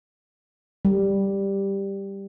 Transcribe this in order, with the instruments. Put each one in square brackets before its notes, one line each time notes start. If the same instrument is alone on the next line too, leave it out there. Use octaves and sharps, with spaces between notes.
[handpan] G3